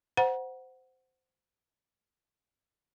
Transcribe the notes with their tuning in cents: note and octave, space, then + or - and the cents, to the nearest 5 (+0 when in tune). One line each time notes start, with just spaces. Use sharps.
C5 -15 F#5 +0 A#5 +40